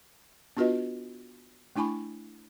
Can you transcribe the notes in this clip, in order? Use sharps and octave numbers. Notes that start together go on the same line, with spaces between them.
B3 D4 F4 F#4 B4 D#5
A3 D4 E4 G#5 B5 C#6